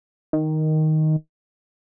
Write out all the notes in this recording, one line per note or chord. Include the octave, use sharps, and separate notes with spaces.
D#3